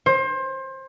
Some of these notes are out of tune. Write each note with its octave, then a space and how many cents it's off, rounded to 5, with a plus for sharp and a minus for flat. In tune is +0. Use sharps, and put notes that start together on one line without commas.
C5 +25